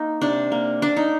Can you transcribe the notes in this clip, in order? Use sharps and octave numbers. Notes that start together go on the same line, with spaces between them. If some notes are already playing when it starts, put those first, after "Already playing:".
Already playing: A#3 D#4
C3 D4
A#3
A#3 D4
D#4